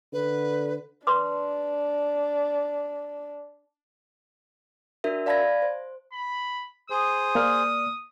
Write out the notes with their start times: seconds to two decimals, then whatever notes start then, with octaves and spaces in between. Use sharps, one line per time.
0.13 D3 B4
1.07 D4 B4 C6 D6
5.04 D4 F#4 A#4 E5
5.26 D5 F5 A5 B5 G#6 A#6
5.62 C5
6.13 B5
6.90 G#4 C5 D#6
7.35 A#3 D5 F6